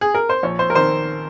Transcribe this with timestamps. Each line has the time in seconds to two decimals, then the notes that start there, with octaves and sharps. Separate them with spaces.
0.01 G#4
0.15 A#4
0.29 C5
0.43 A#1 C#5
0.59 C5
0.70 A#4
0.75 D#3 C5